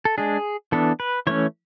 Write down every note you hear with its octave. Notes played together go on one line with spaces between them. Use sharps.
A4
G#3 D4 G#4
E3 B3 D4 A4
B4
E3 A3 C#4 C#5